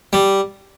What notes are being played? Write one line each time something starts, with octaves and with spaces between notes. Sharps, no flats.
G3